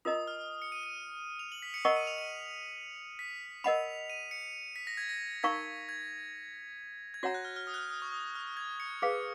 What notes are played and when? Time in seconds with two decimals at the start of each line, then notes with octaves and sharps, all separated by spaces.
0.05 F4 A#4 D#5 A#5 D#6
0.27 F6
0.62 C#7
0.72 D#7
0.83 D#7
1.39 F7
1.52 F#7
1.62 B6
1.74 C#7
1.84 A#4 D#5 F#5 A#5 C#6 C#7
1.96 D#7
2.07 F7
2.18 D#7
3.19 B6
3.64 A#4 D#5 F#5 B5 F7
4.10 D#7
4.31 C#7
4.76 B6
4.87 A#6
4.97 G#6
5.09 A#6
5.43 D#4 A#4 F5 A#5 C#6 G#6
5.89 G#6
7.14 G#6
7.23 F#4 C#5 F#5 A#5 A#6
7.34 F#6
7.45 F6
7.56 F6
7.67 D#6
7.74 F#6
7.78 F6
7.90 D#6
8.02 C#6
8.12 D#6
8.35 F6
8.57 G#6
8.80 C#7
9.02 G#4 B4 F5 C#7